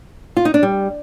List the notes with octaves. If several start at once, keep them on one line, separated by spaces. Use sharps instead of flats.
F4
D#4
D4
G3